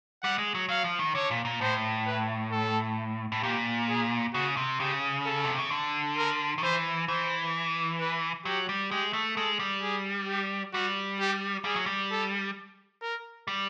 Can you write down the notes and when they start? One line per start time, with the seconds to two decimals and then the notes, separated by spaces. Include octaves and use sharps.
0.23 G3 F#5
0.38 G#3
0.55 F#3
0.69 F#3 F5
0.84 F3
0.99 D#3
1.15 D3 C#5
1.31 A#2
1.45 A#2
1.61 A2 C5
2.06 B4
2.52 A4
3.32 A2
3.43 A#2 G4
3.89 G#4
4.34 C#3 F#4
4.57 C3
4.80 C#3 G4
5.26 A4
5.45 C3
5.58 C#3
5.71 D3
6.17 A#4
6.58 D#3
6.63 E3 C5
7.08 E3 C5
8.00 B4
8.45 F#3 G4
8.69 G3
8.91 G#3 G4
9.13 A3
9.36 G#3 A4
9.59 G3
9.82 G#4
10.28 G4
10.73 G3 F#4
11.19 G4
11.64 G3 G#4
11.76 F#3
11.86 G3
12.11 A4
13.02 A#4
13.48 G3